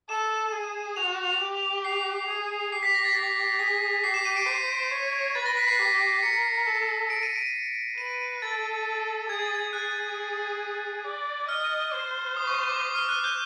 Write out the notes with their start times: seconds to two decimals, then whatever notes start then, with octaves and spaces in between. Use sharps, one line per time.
0.09 A4 E7
0.53 G#4
0.96 F#4 F7
1.41 G4
1.84 C7
2.29 G#4
2.72 G4 C7
2.83 B6
2.94 A#6
3.05 A6
3.15 G4 B6
3.59 G#4 B6
4.04 G4 C7
4.14 E7
4.25 D#7
4.36 D7
4.47 C5 C7
4.91 C#5
5.35 B4 A6
5.46 A#6
5.57 B6
5.68 C7
5.79 G4
6.23 A#4 C#7
6.67 A4
7.10 D7
7.23 D#7
7.36 D7
7.98 B4 D#7
8.42 A4 A6
9.29 G#4 G#6
9.42 A6
9.55 G#6
9.73 G#4 F#6
11.04 D5
11.49 D#5 F6
11.93 C5
12.37 D#6
12.47 C#6
12.59 C#6
12.69 D6
12.81 D#6
12.95 F6
13.09 F#6
13.24 G6